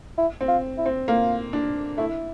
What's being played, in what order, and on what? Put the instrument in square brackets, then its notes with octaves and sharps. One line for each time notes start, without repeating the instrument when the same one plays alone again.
[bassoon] E4
[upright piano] C4
[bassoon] F4
E4
[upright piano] C4
[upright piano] A#3 [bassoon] F4
[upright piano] D4
[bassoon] A3 [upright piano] E4